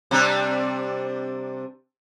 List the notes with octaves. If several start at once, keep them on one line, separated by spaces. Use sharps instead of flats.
C3 G3 D4